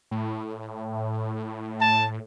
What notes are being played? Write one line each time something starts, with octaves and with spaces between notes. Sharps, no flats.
A2
A5